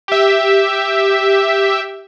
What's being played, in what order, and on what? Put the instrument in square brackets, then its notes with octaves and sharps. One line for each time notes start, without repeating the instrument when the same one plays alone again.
[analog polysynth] G4 E5